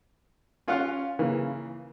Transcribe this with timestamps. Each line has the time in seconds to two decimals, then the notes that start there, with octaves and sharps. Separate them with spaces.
0.68 C#4 F4 C#5 F5 F#5
1.19 C#3 E3 A#3